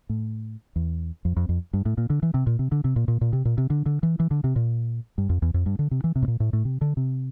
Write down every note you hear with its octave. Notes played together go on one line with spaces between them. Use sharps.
A2
E2
F2
F2
F2
G2
A2
A#2
D3
E3
C3
A#2
C3
D3
C3
A#2
A#2
A#2
C3
A#2
C3
D3
D3
E3
E3
D3
C3
A#2
G2
F2
E2
F2
G2
D3
C3
E3
C3
A2
A#2
A2
A2
C3
D3
C3